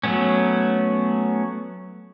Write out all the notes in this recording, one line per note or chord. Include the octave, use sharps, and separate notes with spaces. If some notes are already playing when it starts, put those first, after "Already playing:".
F#3 A3 B3 C#4